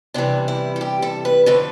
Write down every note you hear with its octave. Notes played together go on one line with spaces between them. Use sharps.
E2 C3 E3 G3 D4
E4
A4
G4
A4
B4
F2 D3 A3 B4